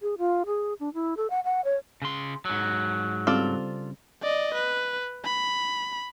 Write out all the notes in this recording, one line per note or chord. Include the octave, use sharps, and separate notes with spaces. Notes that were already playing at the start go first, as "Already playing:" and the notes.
G#4
F4
G#4
D4
E4
A4
F#5
F#5
C#5
C#3 C6
G#2 F#3
C#3 G3 C4 F4 A4 D5
D5 D#5
B4
B5